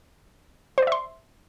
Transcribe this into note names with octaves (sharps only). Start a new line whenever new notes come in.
C5 D5 E5 C6